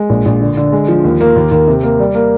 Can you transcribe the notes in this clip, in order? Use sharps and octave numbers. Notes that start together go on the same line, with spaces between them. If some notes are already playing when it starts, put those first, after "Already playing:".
Already playing: G#3
A#1
A#1
D3
D3
G#3
F3
D#2
A#3
D#2
D#2
C3
A#3
G3
A#3